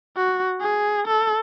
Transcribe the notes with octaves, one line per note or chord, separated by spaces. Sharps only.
F#4
G#4
A4